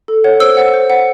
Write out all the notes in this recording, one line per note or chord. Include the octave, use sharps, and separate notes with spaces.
A4
C#5 F#5
C5 E6
F#5
C5
F#5